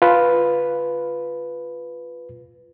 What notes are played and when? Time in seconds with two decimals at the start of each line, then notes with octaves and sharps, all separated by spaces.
0.02 F4 B4